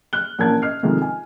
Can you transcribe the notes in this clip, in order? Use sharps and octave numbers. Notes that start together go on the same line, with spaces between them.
F6 F#6 G7
A#1 E3 C#4 A#4 A5 G#6
D#5 F6 C7
C3 D#3 F3 G#3 A3
G#5